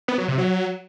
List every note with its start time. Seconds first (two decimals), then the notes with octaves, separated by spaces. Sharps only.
0.08 B3
0.18 F#3
0.28 C3
0.38 F#3